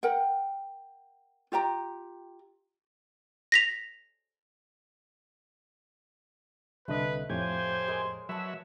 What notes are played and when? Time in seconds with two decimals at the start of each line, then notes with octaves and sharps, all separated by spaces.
0.03 A#4 F#5 G5
1.52 F4 G4 G5 A#5
3.52 A#6 B6 F7
6.88 C2 D3 A3 B4 D#5
7.30 F2 A2 G4 C5 C#5 F5 G#5
7.88 G#3 A#4
8.29 F#3 B4 E5 A5